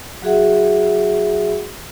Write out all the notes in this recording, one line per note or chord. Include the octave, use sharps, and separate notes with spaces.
F#3 F#4 G#4 E5 F#5